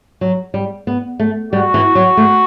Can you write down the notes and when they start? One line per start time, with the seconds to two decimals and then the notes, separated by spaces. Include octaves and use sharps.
0.21 F#3
0.54 G3
0.87 B3
1.20 A3
1.53 G3 F#4
1.74 E3
1.95 F#3
2.17 A3